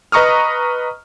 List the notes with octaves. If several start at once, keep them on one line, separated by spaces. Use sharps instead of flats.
B4 D#5 A#5 C#6 D#6 F6